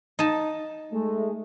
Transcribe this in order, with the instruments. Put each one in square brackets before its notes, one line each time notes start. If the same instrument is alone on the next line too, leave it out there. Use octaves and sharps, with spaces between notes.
[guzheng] D#4 A5
[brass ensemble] G#3 A3